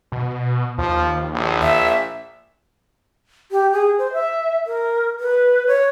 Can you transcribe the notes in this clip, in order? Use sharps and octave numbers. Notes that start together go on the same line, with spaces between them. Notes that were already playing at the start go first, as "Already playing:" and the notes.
B2
D#2 F3
A#1
E5
G4
G#4
C5
E5
A#4
B4
C#5